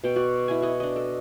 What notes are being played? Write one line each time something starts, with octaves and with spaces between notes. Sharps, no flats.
B2 G5
F#4 D5
E4 G#5
F#4 D#5
D4 D#5
A4